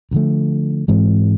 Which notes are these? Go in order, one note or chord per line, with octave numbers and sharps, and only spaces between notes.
D2 D3 F3 A3
G#2 E3 G#3 C4